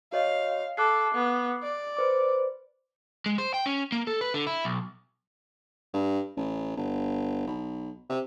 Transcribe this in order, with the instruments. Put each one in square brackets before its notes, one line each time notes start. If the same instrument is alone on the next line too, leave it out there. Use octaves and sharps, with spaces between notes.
[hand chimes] F#4 C#5 D#5 [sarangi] F5
[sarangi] A4 [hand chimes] D6 F#6 C7
[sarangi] B3
D5
[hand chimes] B4 C5 D6
[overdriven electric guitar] G#3
C5
G5
C#4
A#3
A4
B4
D3
E4
B1
[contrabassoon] G2
A1
G1
B1
C3